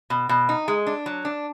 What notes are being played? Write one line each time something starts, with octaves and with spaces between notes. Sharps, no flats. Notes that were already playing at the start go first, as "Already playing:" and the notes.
B2
B2
D#4
G#3
D4
F#3
D4